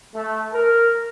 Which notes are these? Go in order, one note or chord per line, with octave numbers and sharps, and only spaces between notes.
A3
A#4